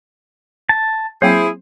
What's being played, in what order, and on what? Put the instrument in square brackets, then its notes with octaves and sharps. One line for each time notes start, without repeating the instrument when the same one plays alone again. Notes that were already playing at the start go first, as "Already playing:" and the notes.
[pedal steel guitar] A5
[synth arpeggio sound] F#3 A#3 C4 [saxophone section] E4 G#4 [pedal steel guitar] C5